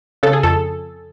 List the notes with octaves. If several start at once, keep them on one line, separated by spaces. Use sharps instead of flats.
C#3 A4
G#4
F2 A4